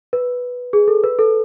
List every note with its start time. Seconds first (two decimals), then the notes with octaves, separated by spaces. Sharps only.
0.13 B4
0.73 G#4
0.88 A4
1.04 B4
1.19 A4